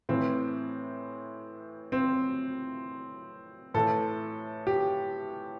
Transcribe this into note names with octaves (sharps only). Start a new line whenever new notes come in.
A2 E3 C4
C4
A2 E3 A4
G4